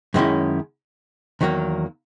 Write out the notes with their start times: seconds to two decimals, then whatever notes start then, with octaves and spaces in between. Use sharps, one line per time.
0.14 F#2 D#3 G#3 C#4 E4
1.41 E2 D#3 F#3 A#3